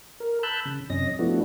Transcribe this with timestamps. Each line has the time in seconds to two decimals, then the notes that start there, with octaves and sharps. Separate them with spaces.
0.20 A#4
0.43 A5 B5 E6 F#6 G6
0.65 C#3
0.90 F#2 C3 C#4 D#5 A#6
1.19 F3 A3 B3 D4 E4 F#4